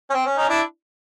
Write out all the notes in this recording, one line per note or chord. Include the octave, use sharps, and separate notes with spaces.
C#4
C4
C#4
C#4 D#4
D4 E4